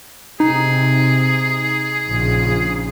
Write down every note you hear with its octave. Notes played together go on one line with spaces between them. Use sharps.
C3 D#4 G#4
A#1 C#3 F3